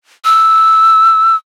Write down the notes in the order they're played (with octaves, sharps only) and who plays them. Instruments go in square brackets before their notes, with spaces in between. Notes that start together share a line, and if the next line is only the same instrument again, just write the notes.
[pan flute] E6